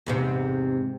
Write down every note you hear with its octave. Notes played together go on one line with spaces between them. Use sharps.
E2 G#2 C3